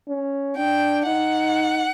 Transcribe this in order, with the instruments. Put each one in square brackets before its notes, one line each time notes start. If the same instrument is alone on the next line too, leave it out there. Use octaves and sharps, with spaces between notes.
[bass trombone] C#4
[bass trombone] D4 [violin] G5
[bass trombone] D#4 [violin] F#5